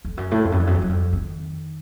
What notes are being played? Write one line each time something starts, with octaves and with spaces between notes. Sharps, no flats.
F2
F#2
A2
F2
F#2
F2
F#2
F2
F#2
F2
D#3